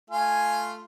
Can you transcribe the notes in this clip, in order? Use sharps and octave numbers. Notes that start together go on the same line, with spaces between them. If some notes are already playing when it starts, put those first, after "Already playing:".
A3 F4 F5 G#5